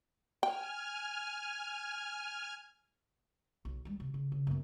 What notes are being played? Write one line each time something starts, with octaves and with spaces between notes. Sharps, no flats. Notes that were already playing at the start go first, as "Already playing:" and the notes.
G5 G#5 F6
B1
G3 G#3
C3
C#3
C#3
F#2 B3